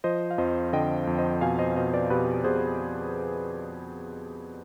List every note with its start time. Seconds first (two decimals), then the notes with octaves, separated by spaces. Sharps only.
0.04 F3 C5 D#5
0.31 F5
0.38 F2 C5 D#5
0.73 D3 D#5 G5
1.07 F2
1.18 C5 D#5
1.41 B2 F5 G#5
1.58 C5 D#5
1.76 B2 C5 D#5
1.94 B4 D5
2.10 B2 G4 B4
2.44 B2 G#4 C5